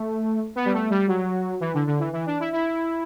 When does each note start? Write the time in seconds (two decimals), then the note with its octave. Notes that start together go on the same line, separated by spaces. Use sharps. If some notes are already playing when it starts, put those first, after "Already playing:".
Already playing: A3
0.56 B3
0.65 G3
0.73 A3
0.90 G3
1.07 F#3
1.60 E3
1.74 D3
1.87 D3
1.99 E3
2.13 E3
2.26 D4
2.40 E4
2.53 E4